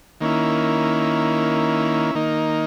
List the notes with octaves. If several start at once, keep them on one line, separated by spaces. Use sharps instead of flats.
D#3 A#3 C#4 E4
D#3 A#3 D#4